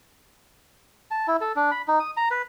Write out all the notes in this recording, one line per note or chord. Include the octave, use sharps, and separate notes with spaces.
A5
E4
A4
D4
B5
D#4
D#6
A#5
B4